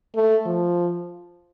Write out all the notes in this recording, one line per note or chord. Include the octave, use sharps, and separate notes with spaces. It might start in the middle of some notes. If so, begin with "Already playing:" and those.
A3
F3